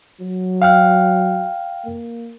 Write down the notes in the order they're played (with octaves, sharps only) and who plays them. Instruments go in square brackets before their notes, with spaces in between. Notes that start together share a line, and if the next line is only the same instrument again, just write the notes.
[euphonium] F#3
[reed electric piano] F5 G5 F6
[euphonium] A#3